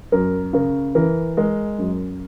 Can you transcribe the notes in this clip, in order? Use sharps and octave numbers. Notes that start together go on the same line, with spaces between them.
F#2 A#4
C#3 A#4
E3 A#4
G#3 A#4
F#2